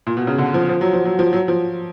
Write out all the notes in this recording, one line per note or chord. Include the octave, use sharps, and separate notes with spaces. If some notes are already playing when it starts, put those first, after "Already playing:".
A#2
B2
C#3
D3
F3
F3
F#3
F3
F#3
F3
F#3
F3